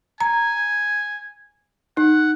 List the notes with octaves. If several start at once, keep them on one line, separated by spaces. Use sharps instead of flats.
G#5 A#5
D#4 F#5